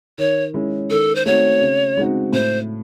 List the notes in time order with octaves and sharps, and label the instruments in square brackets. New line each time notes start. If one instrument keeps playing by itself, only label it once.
[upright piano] D#3 [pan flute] C#5
[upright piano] G#3 C#4 E4
[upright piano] D#3 [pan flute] A4
[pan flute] C5
[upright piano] A3 C4 D#4 F#4 [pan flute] C#5
[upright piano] C#3
G#3 C4 D#4 F#4
[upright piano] A2 [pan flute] C5